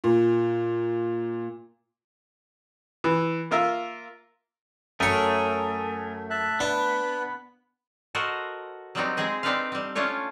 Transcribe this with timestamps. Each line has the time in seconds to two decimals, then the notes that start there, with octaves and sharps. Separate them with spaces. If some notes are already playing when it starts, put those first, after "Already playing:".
0.04 A#2
3.04 E3
3.51 A#3 F4 A#4 E5
5.00 F#2 A3 G#4 A#4 C#5
6.30 E5 A5 F#6
6.60 B3 D4 B4
8.15 F#4 A4 A#4 C5 D#5
8.95 F#3 G3 B3 C4 D4 D#4
9.17 G#3 C4 G#4 D#5
9.43 C4 D4 D#4 A4 B4 F5
9.72 G3 C4
9.95 A3 C#4 D4 F4 C#5